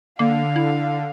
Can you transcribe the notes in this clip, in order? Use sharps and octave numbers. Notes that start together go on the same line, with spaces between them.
D3 A#3 F5
E4